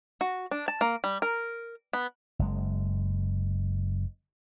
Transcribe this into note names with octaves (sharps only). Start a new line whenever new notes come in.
F#4
D4
A5
A#3
G3
A#4
B3
F#1 G#3